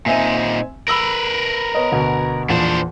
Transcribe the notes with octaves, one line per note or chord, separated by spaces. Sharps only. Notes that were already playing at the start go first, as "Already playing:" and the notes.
A#2 C4 D#4 E5 G#5
A#4 B4 B5 E6 F#7
B3 C#5 D#5
D2 B2
E2 A#2 F3 D4 C5